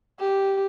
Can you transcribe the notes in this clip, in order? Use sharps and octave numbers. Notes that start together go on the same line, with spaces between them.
G4